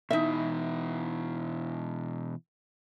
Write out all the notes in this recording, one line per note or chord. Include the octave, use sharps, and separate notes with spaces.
B2 E3 D#4 E4 E5